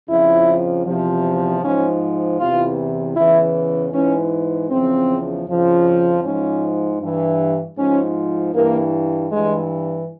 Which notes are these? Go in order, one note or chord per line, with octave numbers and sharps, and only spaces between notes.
F2 C#3 F3 E4
E2 C3 F3
G#2 F3 C#4
E2 C3 E3 F4
E2 C#3 E3 E4
G#2 E3 C#4
E2 C#3 F3 C4
F2 C#3 F3
G#2 F3 C#4
G2 E3
G#2 F3 C#4
G2 E3 A#3
G2 E3 G#3